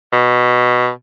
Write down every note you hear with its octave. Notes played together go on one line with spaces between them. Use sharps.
B2